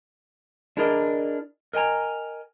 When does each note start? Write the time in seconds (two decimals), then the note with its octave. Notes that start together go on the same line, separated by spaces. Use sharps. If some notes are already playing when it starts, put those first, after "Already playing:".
0.77 D4 E4 G#4 A#4 D5 D#5
1.73 A#4 D#5 G5 G#5 A#5